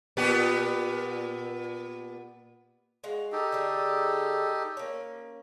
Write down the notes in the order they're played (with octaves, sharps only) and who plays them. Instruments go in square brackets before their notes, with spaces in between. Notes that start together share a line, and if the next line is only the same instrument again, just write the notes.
[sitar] A#2 B3 G4
[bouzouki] G#3 F#4 F5
[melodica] D#4 G4 A4
[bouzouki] D3 G#4
A#3 C#4